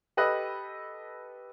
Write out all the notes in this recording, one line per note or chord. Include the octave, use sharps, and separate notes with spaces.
G4 A4 B4 D#5 B5 F#6